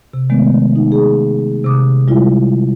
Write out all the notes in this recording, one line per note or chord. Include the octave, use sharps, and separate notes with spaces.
C3
D#3 G#3 A3 B3
D#4
G#4
C3 D6 D#6
G3 G#3 E4 F4